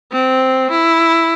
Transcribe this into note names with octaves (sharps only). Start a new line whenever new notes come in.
C4
E4